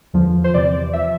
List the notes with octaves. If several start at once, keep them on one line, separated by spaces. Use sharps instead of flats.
E2 D3 F3
C5
E2 C3 E3 D5
F3 E5